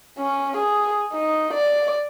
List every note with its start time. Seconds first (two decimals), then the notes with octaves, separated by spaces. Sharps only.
0.18 C#4
0.57 G#4
1.13 D#4
1.54 D5